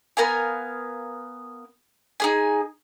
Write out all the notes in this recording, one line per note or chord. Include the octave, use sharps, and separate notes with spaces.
B3 A#4 F5 G#5
D#4 G#4 G#5